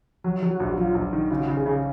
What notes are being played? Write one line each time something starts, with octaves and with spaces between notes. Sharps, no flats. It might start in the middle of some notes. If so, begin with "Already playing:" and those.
F#3 F#4
F#3
F#4
A#1
F#3 F4
A#1
D#3
C#3 F#4
C#3
G#4
C#3